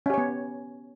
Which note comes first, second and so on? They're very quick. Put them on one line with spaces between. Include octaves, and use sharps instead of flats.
C#4 G4 C#5 B3